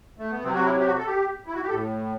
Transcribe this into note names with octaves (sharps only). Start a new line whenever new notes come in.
A3
B3
C3 F#3 C4
F#4
E4
G4
F#4
A4
G4
E4
F#4
G4
A2 A4